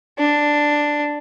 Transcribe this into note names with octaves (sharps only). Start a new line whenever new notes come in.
D4